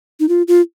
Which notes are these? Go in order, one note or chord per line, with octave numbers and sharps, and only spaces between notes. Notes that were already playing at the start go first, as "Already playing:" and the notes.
D#4
F4
F4